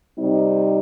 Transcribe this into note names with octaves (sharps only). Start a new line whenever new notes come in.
C3 G3 C4 D#4